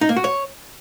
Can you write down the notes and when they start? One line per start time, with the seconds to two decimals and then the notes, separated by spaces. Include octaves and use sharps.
0.01 D#4
0.09 A#3
0.16 F#4
0.24 C#5